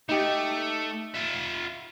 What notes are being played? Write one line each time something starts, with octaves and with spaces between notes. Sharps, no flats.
A3 D#4 G4
F4 E5